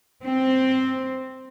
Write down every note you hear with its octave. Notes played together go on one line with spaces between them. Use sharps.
C4